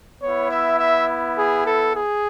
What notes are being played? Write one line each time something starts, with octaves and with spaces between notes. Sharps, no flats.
B3 C#5
E4
E5
E5
G#4
A4
G#4